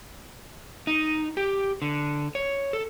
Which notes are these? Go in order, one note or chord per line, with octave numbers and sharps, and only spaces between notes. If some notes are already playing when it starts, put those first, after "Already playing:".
D#4
G4
D3
C#5
A4